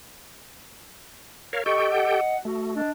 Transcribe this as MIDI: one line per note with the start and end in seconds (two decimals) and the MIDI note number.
1.53 1.64 70
1.53 1.64 73
1.53 1.64 77
1.66 2.21 67
1.66 2.21 69
1.66 2.37 75
1.66 2.21 79
1.66 1.86 85
1.92 2.38 78
2.45 2.81 57
2.45 2.75 66
2.76 2.92 62
2.76 2.91 75